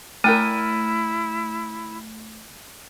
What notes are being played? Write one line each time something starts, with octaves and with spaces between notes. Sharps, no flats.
A3 E4 A#4 G5 G#5 F6 A6 D#7